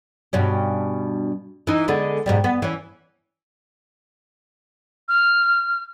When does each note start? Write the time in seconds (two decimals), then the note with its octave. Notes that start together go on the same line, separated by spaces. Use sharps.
0.33 G2 B2 C#4
1.67 E3 D#4
1.88 D3 G#3 B3
2.26 G#2 B2 G3
2.44 B3
2.62 E3 C#4
5.08 F6